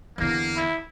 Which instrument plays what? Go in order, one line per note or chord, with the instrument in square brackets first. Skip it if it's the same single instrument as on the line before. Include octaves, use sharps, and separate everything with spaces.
[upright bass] E2 D3 [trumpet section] A#3
[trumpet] E4